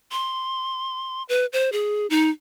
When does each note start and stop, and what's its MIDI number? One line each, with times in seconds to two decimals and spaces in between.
0.12 1.23 84
1.29 1.46 71
1.53 1.72 72
1.72 2.07 68
2.10 2.30 63